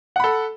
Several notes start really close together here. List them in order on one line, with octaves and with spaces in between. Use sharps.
F#5 B5 A4